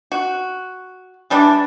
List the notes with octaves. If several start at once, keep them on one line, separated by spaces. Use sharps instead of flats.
F#4
E3 G3 D4